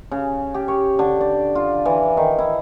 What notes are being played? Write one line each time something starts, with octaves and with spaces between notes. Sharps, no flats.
C#3
G4
C#5
D3
D5
F4
E3
D#3
E4